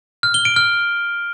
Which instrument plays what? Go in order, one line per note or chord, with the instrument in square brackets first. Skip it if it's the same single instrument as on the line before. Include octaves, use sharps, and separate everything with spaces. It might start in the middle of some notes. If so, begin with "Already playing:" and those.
[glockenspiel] F6
G7
D7
F6